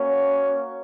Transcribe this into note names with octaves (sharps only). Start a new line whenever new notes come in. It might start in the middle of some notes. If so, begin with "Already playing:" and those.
Already playing: A#3 C#4 F#4 C#5